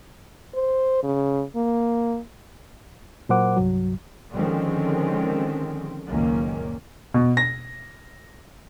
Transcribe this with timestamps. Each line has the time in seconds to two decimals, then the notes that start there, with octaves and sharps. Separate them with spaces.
0.55 C5
1.03 C#3
1.56 A#3
3.29 A#2 F#3 A#4 C5 F#5 D6
3.57 C2 G2 F#3
4.34 D3 D#3 F3 G#3 C4 C#4
6.08 F#1 C#2 A#2 D#3 A#3 C#4
7.14 B2
7.37 A#6